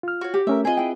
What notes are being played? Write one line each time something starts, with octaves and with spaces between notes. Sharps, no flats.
F4 F6
F#4 C#5
G4
A3 C#4 A#4 E5
C4 F4 G#4 B4 D#5
E4 G5